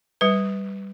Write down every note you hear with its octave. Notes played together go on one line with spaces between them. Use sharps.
G3 B4